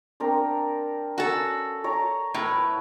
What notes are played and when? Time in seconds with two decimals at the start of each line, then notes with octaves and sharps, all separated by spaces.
0.20 C4 D4 A#4
1.18 C#4 F#4 A4 F5 A5
1.84 C#5 A#5 D6
2.34 A2 E4 B4